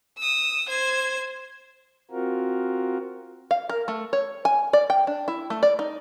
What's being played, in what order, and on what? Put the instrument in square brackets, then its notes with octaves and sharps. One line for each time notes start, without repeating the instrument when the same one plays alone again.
[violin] D#6 E6
C5 G#6
[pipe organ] C4 F4 F#4 A#4
[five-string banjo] F5
A#4
A3
C#5
G#5
D5
G5
D4
E4
A3
D5
D#4